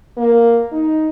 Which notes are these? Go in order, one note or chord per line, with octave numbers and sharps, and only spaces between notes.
A#3
D#4